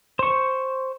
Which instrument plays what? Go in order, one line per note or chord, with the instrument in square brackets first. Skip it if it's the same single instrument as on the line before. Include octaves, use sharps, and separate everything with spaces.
[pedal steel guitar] C5 C#6